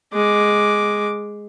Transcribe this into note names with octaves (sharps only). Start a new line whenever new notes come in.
G#3 D6